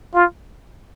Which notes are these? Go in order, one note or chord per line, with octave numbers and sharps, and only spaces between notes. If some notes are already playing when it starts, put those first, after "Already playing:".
F4